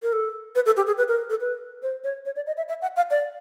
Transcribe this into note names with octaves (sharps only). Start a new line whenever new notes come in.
A#4
A4
B4
A4
G4
G#4
B4
A#4
A4
B4
C5
C#5
C#5
D5
D#5
E5
E5
F#5
F5
D5